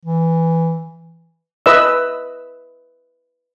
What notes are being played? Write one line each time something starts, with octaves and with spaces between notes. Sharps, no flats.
E3
B4 D#5 E5 E6